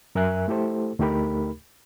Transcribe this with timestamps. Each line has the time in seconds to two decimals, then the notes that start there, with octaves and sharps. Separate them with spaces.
0.15 F#2 A#4 E5 G#5 F#6
0.48 A3 E4 G4 A4 C5
0.99 D2 A3 D#4 G4 A#4 B5